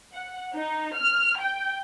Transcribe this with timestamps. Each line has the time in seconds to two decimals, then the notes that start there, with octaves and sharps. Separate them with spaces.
0.13 F#5
0.55 D#4
0.95 F6
1.40 G5